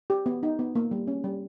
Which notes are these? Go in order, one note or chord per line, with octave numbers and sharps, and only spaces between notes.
G4
B3
D#4
B3
A#3
G3
C#4
G3